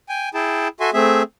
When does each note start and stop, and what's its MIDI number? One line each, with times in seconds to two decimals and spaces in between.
0.09 0.29 79
0.09 0.29 80
0.34 0.68 64
0.34 0.68 68
0.34 0.68 79
0.34 0.68 81
0.80 0.90 66
0.80 0.90 69
0.80 0.90 76
0.80 0.90 80
0.80 0.90 84
0.94 1.22 57
0.94 1.22 60
0.94 1.22 68
0.94 1.22 76